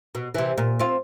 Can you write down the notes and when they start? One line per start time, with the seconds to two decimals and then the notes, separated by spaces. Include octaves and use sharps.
0.15 B2
0.35 C3 E3
0.58 A#2
0.79 C4 F4